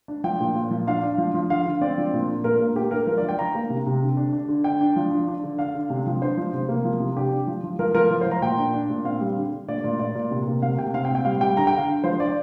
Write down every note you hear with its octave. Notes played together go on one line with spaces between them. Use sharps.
D4
F3 G5
A#2
A#2
F3
D4 F5
D4
F3
F3
D3 F5
D3
C4 D5
F3
A#2
D4
A#2 A#4
A#3
A#3 G4
D4 A#4
F3 A#4
D5
F3
G5
D4 A#5
A#3
C3
C3
D3
D4
D4
D3
D4 G5
D4
F3
D4
D4
D3
D4 F5
D3
C3
F3
D4 C5
F3
C3
A#3
F3
C3
D4 G4
D4
F3
F3
F3 A#4
F3 A#4
F3 A#4
C5
F3 A#5
A#2 G5
D4
D4
A#2
C4 F5
G3
D3
D3
A#2 D5
A#2
A#2 D5
A#2
C3
A#3
C3 F5
C3 G5
C4 F5
G5
A#2
G5
G3 F5
G3 G5
D3 A#5
G5
D3
F5
D3
F3 C5
D4 D5